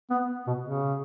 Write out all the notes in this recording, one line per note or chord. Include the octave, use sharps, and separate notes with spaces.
B3
B2
C#3